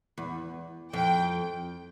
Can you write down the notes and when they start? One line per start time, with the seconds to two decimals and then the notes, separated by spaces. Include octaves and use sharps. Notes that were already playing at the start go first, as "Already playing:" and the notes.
0.18 E2
0.93 F2 G5